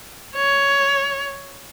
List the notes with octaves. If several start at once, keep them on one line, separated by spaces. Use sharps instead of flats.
C#5